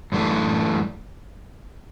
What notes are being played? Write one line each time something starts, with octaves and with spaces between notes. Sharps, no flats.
F#2 E3 A3 D4